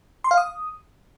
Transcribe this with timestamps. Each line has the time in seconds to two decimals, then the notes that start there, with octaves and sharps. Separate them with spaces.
0.24 C6
0.31 F5
0.37 D#6